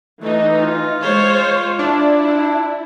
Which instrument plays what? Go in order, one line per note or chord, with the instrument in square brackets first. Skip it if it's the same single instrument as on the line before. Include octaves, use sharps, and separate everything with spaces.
[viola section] E3 D#4 [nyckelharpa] A3
[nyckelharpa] F4
[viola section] G#3 C5 C#5
[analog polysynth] D4 [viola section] E4